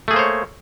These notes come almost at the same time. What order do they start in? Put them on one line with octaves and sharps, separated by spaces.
A3 G#4 A#3 C5 C#5